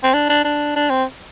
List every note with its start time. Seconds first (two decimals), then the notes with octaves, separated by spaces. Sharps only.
0.04 C4
0.14 D4
0.29 D4
0.45 D4
0.76 D4
0.90 C4